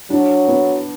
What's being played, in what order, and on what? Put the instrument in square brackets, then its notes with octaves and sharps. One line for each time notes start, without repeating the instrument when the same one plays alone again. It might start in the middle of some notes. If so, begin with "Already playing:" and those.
[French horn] F#3 [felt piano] D4
[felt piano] B3